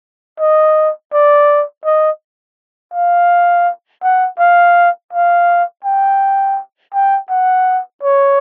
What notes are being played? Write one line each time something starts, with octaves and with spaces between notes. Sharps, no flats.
D#5
D5
D#5
F5
F#5
F5
F5
G5
G5
F#5
C#5